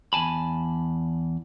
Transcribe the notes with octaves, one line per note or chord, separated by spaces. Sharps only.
E2 G#5 A5 B5